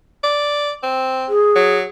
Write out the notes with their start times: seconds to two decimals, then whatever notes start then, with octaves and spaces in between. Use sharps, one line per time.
0.23 D5
0.83 C4
1.29 G#4
1.55 F#3